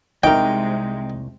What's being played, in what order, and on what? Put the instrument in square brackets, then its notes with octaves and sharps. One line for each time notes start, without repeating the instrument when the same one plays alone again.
[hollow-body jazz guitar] C2 A#4 [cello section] C3 G#3 [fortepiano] D#4 [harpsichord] G5